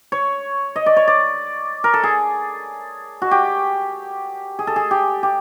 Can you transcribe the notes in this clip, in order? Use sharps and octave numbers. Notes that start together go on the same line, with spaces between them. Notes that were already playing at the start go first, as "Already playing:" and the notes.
C#5
D#5
D5
C#5
D5
A#4
A4
G#4
F#4
G4
G#4
A4
G#4
G4
G4